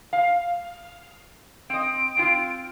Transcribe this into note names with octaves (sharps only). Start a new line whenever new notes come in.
F5
C4 D#5 D7
C4 F4